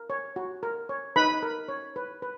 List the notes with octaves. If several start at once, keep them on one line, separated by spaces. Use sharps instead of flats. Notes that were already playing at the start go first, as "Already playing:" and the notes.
Already playing: A#4
C#5
F#4
A#4
C#5
D#4 B4 B5
A#4
C#5
B4
B4